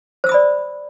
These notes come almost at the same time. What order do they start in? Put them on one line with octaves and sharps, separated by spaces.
C5 E6 D#6 B5 D5